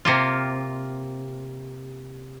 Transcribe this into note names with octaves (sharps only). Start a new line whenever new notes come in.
C3 A#3 F4